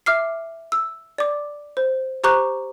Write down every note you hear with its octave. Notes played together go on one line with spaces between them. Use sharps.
E5 D6 F6 C7
E6
D5 D6
C5
G4 C5 A#5 C#6 D6 F#6